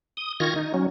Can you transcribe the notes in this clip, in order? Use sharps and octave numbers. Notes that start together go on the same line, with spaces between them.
D#6
D#3 F4 C#6 G#6 A#6
D#4
F#3 C#4